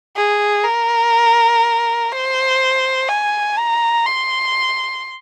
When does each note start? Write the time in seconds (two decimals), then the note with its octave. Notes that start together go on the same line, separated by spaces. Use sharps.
0.16 G#4
0.64 A#4
2.12 C5
3.09 G#5
3.57 A#5
4.06 C6